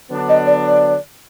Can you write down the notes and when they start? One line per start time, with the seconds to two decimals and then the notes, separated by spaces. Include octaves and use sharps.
0.11 D3 F#3 B3 D4
0.29 D#5
0.46 D5
0.64 D5